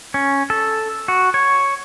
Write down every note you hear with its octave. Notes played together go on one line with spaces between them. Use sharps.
C#4
A4
F#4
C#5